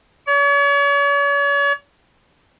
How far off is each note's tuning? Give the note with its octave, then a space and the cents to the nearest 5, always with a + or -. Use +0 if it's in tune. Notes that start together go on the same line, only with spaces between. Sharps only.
C#5 +40